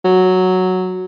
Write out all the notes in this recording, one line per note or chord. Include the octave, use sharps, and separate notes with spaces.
F#3